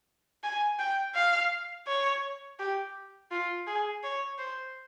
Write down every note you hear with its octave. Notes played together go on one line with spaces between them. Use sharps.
G#5
G5
F5
C#5
G4
F4
G#4
C#5
C5